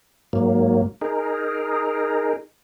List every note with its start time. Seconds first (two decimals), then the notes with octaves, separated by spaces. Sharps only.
0.33 G#2 F#3 A#3
1.01 D#4 G#4 A#4